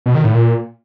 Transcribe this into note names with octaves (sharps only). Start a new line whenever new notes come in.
B2
D#3
A2
A#2